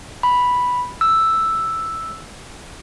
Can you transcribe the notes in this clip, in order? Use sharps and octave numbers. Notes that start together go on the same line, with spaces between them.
B5
E6